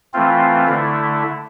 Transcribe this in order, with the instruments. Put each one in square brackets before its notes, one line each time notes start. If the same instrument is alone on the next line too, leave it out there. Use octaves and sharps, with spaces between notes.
[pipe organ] E3 A3 C4 F4
D3 A3 E4